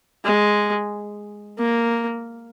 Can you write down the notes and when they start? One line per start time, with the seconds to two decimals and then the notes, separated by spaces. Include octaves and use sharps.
0.25 G#3
1.59 A#3